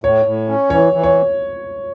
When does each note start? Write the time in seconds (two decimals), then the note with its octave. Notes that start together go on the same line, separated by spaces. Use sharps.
0.04 A2 C#5
0.26 A2
0.49 C#4
0.70 E3 C#5
0.93 E3
1.03 C#5